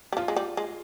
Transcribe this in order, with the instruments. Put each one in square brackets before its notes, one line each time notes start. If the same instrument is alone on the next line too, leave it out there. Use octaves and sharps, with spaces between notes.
[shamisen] G3
[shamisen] F3 [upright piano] F4
[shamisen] G#3
G3
G#3